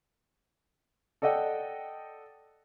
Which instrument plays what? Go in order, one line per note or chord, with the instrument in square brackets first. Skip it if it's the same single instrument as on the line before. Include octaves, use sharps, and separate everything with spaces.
[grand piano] A4 D5 D#5 F#5 G5